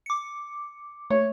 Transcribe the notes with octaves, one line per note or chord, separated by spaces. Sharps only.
D6 C#7
A3 C#5